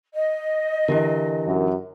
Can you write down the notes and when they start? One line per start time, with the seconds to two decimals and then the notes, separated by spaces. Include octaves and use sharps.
0.13 D#5
0.88 D3 E3 E4 G4 A#4
1.47 F#2